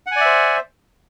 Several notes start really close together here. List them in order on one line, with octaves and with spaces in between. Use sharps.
F#5 G#5 D5 E5 C5